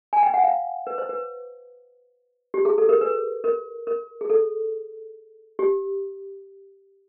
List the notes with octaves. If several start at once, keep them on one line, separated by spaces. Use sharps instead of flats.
G#5
G5
F#5
F5
B4
C5
B4
G4
G#4
A4
A#4
B4
A#4
A#4
G#4
A4
G4